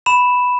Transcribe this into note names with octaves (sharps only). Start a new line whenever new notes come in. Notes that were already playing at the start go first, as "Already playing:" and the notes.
B5 E7